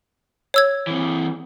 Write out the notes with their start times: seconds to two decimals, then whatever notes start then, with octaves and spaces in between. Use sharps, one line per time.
0.54 C#5 E6 G#6
0.87 E3 C4